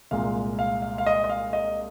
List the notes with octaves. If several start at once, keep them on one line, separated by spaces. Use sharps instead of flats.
C2 A#2 G#3 F5
F5
F5
F5
D#5
D#5
F5
D#5